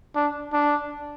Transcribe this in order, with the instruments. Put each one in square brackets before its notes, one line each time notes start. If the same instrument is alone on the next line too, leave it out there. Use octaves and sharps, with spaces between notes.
[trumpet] D4
D4